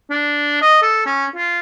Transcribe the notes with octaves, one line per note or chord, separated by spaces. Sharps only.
D4
D#5
A4
C#4
F4